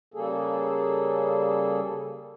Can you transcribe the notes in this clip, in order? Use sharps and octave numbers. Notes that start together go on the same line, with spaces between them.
C#3 G3 A#3 G#4 A4